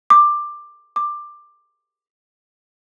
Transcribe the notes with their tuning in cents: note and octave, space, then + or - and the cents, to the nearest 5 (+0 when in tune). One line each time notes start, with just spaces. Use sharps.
D6 +10
D6 +15